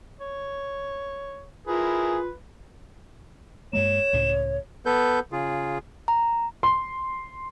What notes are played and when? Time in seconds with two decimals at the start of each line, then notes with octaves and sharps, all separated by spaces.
0.20 C#5
1.67 E4 F4 G#4 A#4 B4
3.73 G2 G#3 A#3 C#5 E7
4.13 C#2 A2 C#3
4.86 B3 A4 B4 G6
5.32 C#3 F4 G#4
6.08 A#5
6.63 C6